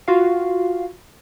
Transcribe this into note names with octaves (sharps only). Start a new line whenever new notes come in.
F4 F#4 F5